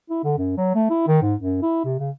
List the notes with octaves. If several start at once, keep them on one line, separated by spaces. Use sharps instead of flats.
E4
D3
F#2
F#3
A3
E4
D#3
G#2
F#2
E4
C3
C#3